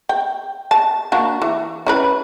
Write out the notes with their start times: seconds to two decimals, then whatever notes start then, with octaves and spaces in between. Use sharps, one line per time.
0.09 G5
0.71 A5
1.12 A#3 D4 F#4
1.42 E3
1.86 C#4 E4 B4